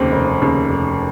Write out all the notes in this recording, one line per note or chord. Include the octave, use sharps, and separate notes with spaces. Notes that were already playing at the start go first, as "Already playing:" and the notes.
Already playing: F1 D#2 C#3 A#3 C4
F1
D#2 C#3
F1